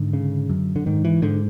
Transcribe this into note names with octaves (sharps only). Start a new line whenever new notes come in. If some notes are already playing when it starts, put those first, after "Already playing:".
Already playing: G#2 D3
C#3
F#2
D3
G#2 D#3
E3
G#2 D3